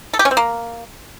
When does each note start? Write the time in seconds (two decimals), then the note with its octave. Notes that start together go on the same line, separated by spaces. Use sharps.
0.13 A4
0.19 G4
0.25 C#4
0.31 C4
0.37 A#3